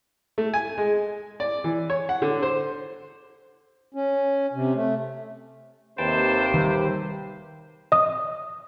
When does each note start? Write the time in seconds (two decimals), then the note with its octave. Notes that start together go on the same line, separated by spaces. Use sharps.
0.38 A3
0.54 G#5
0.78 G#3
1.40 D5
1.64 E3
1.90 C#5
2.09 F#5
2.22 D3
2.42 C5
3.94 C#4
4.53 C3
4.74 A3
5.98 D#2 C3 B4 C5 G5 A5
6.54 D#3 F3 G3 G4 B4
7.92 D#5 D#6